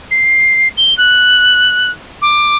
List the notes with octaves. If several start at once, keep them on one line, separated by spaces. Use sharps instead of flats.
C7
G7
F#6
D6